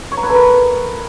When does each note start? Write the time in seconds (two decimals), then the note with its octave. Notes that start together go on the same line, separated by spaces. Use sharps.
0.12 C#5
0.17 A#5
0.23 B4
0.29 A4
0.35 A#4